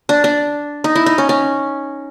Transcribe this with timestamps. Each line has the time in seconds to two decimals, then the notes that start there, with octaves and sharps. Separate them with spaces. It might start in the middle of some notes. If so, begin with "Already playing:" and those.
0.09 D4
0.24 D4
0.84 D#4
0.95 E4
1.06 D#4
1.18 C#4
1.29 C#4